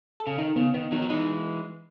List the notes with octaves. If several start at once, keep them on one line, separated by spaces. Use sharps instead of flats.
A4
C#3
D#3 D#4
C#3 B3
D#3 B3
D#3 F#3 D#4
F#3
E3 G#3 D#4